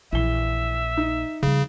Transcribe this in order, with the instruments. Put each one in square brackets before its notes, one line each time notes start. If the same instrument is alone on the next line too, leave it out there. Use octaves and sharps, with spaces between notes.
[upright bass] A#1 [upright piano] E3 G7 [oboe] E5
[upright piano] D#4
[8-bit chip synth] C#3 [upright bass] F3 G3